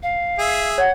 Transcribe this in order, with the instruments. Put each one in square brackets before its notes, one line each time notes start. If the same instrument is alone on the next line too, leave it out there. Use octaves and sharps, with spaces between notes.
[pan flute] F5
[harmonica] G#4 E5
[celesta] C#5 [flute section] F#5 G#6